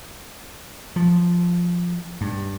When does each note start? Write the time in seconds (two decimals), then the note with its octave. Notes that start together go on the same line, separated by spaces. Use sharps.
0.96 F3
2.21 G2